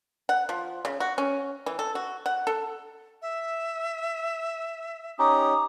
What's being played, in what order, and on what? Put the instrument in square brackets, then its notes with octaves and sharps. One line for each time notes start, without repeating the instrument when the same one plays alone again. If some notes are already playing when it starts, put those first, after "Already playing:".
[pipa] F#5
F3
C#3
F#4
C#4
E3
A4
F#4
F#5
A4
[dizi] E5
[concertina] C#4 D#4 G4 [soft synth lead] A#5 [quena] D#6